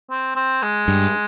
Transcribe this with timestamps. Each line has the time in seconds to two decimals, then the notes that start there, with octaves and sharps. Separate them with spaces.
0.10 C4
0.35 C4
0.62 G#3
0.88 G2